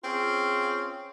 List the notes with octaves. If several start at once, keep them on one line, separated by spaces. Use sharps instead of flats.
C4 C#4 F4 G#4